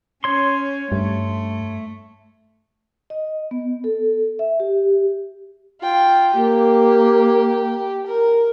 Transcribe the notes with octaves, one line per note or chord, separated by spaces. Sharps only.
C#4 C#5 C6
G2 A3
D#5
B3
A4
E5
G4
F4 G5
A#3 G4
A#4